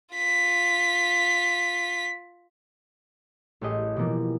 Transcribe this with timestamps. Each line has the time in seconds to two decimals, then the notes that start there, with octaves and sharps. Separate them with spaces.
0.15 F4 B6
3.61 A1 A3 G4 G#4 D#5
3.97 B2 E3 F3 A#3